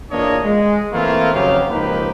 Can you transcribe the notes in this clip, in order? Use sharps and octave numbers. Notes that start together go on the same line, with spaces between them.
E2 A#3 D4 F4 C#5 D#5
G#3
E3 A3 A#3 C4 E4 F4
F#1 F2 C#3 F#3 G4 F5
C#2 F3 A#3 D#4 G4 B4